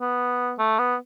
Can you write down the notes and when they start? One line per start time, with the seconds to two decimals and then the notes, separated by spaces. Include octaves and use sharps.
0.01 B3
0.59 A3
0.78 B3